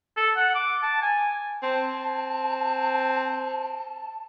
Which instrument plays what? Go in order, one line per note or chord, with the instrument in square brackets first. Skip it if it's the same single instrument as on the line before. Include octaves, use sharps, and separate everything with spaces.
[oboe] A4
F#5
D6
A5
G#5
[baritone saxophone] C4 [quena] A5